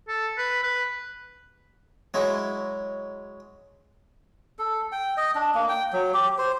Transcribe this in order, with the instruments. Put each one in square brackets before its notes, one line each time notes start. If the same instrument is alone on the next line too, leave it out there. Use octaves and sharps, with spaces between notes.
[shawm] A4
B4
B4
[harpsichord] F#3 G#3 E4
[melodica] A4
G5
D#5
D4
A#3
G5
F#3
G4
C5